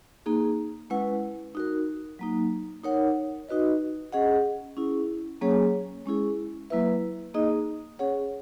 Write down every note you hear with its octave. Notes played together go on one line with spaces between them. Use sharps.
A#3 D#4 G#4
G#3 C#4 E4 B4 F#5
D#4 F#4 A#4
F#3 A#3 D#4
D#4 A#4 C#5 F#5
D#4 F#4 B4 D#5
C#4 G#4 D#5 F#5
C#4 E4 G#4
F#3 A#3 C#4 G#4 C#5
G#3 C#4 E4 G#4
F#3 A#3 E4 B4 E5
A#3 D#4 G#4 D#5
C#4 G#4 C#5 F#5